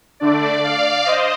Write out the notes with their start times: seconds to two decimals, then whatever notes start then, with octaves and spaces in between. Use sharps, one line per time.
0.20 D3 A3 D4 D5
0.64 D5 F5
1.05 C5 D#5